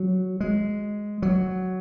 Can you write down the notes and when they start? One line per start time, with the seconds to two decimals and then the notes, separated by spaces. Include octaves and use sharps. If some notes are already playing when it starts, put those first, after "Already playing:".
Already playing: F#3
0.40 G#3
1.22 F#3